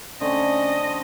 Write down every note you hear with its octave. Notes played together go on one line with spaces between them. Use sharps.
D3 A3 C4 C#4 D#5